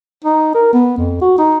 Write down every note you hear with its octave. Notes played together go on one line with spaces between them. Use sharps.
D#4
A#4
B3
F2
F#4
D#4